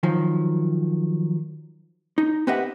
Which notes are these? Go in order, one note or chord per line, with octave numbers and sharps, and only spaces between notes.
D#3 F3 F#3
D#4
C4 G4 B4 D#5 E5 F#5